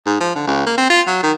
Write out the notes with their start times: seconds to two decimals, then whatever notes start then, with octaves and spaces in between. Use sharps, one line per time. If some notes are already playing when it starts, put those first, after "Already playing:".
0.06 G#2
0.20 F3
0.35 D3
0.47 C#2
0.66 A#3
0.78 C4
0.90 F4
1.07 F#3
1.23 D#3